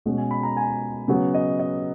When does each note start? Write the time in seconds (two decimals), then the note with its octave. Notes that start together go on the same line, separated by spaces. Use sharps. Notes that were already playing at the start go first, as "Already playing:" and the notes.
0.06 B2 G#3 C#4
0.18 G#5
0.31 B5
0.43 A#5
0.57 G#5
1.08 C#3 F#3 B3
1.34 D#5
1.59 D#5